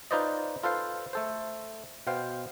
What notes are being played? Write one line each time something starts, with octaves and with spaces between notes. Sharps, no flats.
D#4 F4 B4 C5 D5 D#5
F4 A4 B4 C5 F5
A3 A4 C5
B2 B3 C5 F5 G5